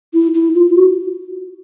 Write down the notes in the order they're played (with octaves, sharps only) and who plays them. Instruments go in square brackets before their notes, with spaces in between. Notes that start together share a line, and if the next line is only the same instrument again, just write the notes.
[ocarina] E4
E4
F4
F#4